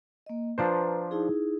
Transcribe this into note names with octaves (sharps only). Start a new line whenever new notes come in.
A#3 D#5
F3 D4 B4 C5 A#5
D#4 E4 G#4